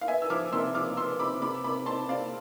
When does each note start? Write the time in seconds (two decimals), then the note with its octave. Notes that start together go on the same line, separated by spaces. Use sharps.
0.01 F5
0.08 B3 E5 G#5
0.22 E6
0.30 F3 D6 F6
0.53 C3 C6 E6
0.74 F3 D6 F6
0.97 B3 C6 E6
1.19 C3 B5 D6
1.42 C3 B5 D6
1.64 C3 B5 D6
1.86 C4 A5 C6
2.09 C4 D5 F5